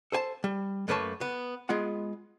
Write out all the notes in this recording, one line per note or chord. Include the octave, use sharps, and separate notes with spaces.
A4 C5 G#5 A5
G3
F#2 A3 A#3 B4 C#5 A5
B3
G#3 B3 F4 F#5